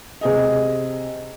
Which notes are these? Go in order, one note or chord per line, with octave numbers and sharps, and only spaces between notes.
C3 G#4 D#5